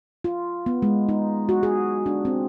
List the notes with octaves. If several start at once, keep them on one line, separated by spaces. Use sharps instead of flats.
F4
B3
G#3
D#4
F#4
G#4
D4
C4